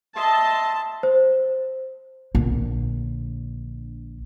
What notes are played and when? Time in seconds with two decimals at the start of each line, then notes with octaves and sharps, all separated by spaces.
0.16 D#5 E5 A5 C6
1.03 C5
2.35 A#1 D3